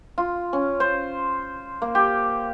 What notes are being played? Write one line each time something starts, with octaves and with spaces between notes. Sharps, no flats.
F4
C#4
C5
A#3
G4